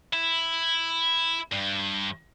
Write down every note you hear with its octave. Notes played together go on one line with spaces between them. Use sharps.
E4
G2